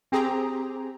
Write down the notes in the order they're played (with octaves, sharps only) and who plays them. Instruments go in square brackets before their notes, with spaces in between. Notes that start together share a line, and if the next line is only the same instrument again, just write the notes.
[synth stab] C4 G4 G#4 A#5